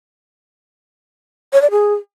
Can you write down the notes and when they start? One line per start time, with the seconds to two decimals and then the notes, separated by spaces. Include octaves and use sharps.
1.53 C#5
1.62 D5
1.71 G#4